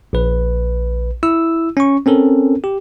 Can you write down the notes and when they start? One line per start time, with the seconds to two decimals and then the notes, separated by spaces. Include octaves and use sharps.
0.13 A#1 B4
1.23 E4 E6
1.77 C#4 C#6
2.06 C4 C#4 A4 A#4
2.64 G4